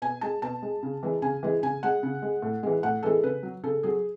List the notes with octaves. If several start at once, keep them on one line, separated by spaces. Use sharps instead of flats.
B2 G#5
G#3 A5
B2 A5
G#3
C#3
E3 G#3
C#3 G#5
E3 G#3
C#3 G#5
G#3 F#5
C#3
G#3
A2
E3 G#3
A2 F#5
E3 G#3 A4
C#3 B4
F#3
C#3 A4
F#3 G#4